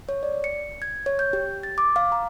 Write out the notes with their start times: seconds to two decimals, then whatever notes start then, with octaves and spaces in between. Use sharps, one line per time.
0.09 C#5
0.23 D5
0.44 C#7
0.82 G#6
1.06 C#5
1.19 G6
1.33 G4
1.63 A6
1.78 D6
1.96 F5
2.12 A#5